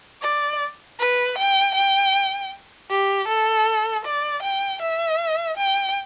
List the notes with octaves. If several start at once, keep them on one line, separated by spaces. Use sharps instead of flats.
D5
B4
G5
G5
G4
A4
D5
G5
E5
G5